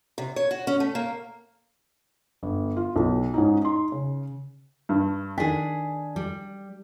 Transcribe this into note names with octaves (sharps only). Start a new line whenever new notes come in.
C3
C#5
F#4
C#4
A3
A#3
G1
F4
B1
G#2 C#4 D#4
D#4 C6
C#3
G2
D#3 D4 G#4 G#5 B6
G3